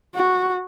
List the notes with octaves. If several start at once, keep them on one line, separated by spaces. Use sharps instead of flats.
F#4